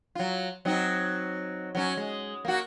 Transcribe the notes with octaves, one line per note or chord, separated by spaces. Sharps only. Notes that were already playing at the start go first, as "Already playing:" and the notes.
F#3 F4
F#3 C4 D#4
F#3 C#4
G#3
A#3 F#4